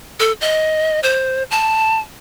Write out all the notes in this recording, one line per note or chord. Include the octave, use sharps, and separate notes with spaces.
A4
D#5
C5
A5